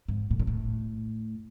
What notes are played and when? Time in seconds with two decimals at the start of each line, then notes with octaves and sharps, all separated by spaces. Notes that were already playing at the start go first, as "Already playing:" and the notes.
0.08 G#2
0.31 A2
0.40 A#2
0.47 A2